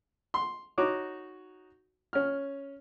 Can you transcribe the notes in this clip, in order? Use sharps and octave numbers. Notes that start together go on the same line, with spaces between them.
C6
D#4 F#4 C#5 D6
C#4 F6